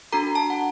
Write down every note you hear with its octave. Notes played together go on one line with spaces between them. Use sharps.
D4 F#4 A4 A#5
A5
F#5